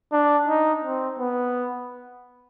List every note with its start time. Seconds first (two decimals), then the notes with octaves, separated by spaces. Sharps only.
0.12 D4
0.48 D#4
0.84 C4
1.19 B3